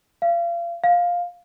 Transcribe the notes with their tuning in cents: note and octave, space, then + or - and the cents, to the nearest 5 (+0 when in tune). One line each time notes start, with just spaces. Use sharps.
F5 -35
F5 +10